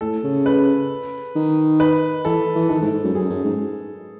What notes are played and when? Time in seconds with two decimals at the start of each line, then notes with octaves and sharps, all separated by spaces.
0.01 A2 A4
0.23 C#3
0.46 B4
1.36 D#3
1.80 B4
2.25 E3 A4
2.55 E3
2.69 D#3 A4
2.82 G#2
2.92 G#2
3.03 F#2
3.14 F#2 G#4
3.30 F#2
3.44 G#2